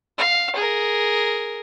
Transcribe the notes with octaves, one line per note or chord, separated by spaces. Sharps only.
F5
G#4 A#4